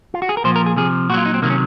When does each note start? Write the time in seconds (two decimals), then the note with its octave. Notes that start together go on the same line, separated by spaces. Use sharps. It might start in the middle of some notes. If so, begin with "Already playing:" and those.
0.14 F4
0.22 F#4
0.29 G#4
0.37 A#4
0.44 A#2 F3 C5
0.56 A#4
0.66 G#4
0.77 C3 F3 G#4
1.10 A#2 F#4
1.14 F#3 F4
1.26 D#4
1.34 C4
1.42 C3 D#3 F#3 A#3
1.50 C#4